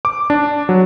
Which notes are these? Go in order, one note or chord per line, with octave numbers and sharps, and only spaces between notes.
D6
D4
F#3